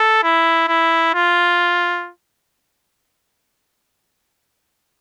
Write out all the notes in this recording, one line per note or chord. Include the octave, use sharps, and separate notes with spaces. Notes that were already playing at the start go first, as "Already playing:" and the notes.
Already playing: A4
E4
E4
F4